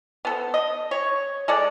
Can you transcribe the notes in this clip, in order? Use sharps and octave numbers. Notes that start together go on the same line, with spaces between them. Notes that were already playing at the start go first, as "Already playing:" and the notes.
B3 A4 C5
D#5
C#5
G#3 A4 D5